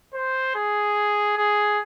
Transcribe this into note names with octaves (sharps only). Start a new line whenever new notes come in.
C5
G#4
G#4